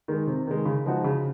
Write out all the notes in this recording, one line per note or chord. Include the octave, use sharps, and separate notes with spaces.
D#3 G#3
C3
D#3 G#3
C#3
F3 G#3 D#4 F#4
C#3